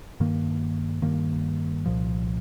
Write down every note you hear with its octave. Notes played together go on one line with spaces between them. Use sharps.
G2 D#3 A#3
G2 D#3 A#3
C2 A#2 F3